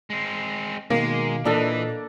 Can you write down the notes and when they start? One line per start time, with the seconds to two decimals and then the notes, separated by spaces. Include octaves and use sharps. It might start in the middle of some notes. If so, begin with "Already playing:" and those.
0.10 G#3 C4
0.90 B2 D#3 G#3 A#3
1.45 A#2 E3 D4 A4 D#5 A5